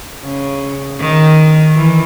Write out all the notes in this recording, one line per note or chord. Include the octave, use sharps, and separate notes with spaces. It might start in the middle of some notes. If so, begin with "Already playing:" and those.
C#3
D#3
E3